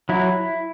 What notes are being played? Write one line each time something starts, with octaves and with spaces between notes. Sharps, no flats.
F#3 E4